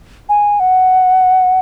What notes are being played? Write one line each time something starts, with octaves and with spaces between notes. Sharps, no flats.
G#5
F#5